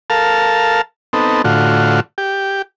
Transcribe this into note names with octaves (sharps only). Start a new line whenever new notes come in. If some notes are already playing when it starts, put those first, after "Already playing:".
A4 A#4 F5 A5
B3 C4 D#4 A4
A2 D3 F4 F#4
G4